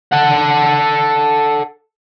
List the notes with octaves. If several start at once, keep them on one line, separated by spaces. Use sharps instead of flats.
A4 F#5